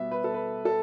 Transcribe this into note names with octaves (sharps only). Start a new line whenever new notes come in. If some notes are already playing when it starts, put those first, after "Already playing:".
Already playing: B2 G3 B3 E5
B4
A4
B4
A4